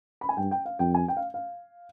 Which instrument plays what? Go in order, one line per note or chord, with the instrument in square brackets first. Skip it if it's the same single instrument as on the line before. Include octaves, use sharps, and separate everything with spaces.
[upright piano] B5
G#5
[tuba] G2 [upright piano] G5
[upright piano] G5
F5
[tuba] F2 [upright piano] G5
[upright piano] G#5
G5
F5
F5